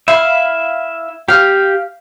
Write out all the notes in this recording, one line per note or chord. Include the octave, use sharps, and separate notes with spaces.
E4 E5 F5
G4 F5 F6